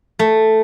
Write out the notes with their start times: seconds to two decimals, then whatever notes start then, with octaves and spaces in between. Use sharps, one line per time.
0.19 A3